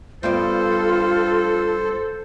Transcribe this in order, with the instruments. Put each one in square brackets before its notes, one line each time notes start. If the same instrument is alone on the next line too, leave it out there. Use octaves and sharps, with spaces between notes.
[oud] G2 B3 D5 [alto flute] F4 [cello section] A4 [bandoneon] C5